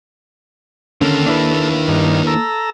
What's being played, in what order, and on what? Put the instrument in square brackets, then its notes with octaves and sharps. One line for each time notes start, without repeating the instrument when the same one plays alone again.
[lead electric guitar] D#2 A#3 [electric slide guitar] D3 C#4 [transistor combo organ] A4
[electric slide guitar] D4 E4 B4
[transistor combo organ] G2 D#3
A4 A#5 E6